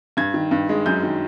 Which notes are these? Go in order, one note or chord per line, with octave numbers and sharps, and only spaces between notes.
G2 G#6
D#3
G2
G#3
F#2 G6
D#3